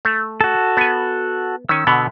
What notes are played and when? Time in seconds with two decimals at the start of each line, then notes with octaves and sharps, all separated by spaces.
0.05 A3
0.41 F#4 A4
0.77 B3 G#5
1.69 D#3 C#4 E6
1.87 B2 D3 B3